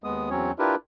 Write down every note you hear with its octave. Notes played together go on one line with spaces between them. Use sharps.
D#2 G#3 B3 D#6
E2 F#3 C4 C#4 C#5
D4 E4 F4 G4 A#4 B4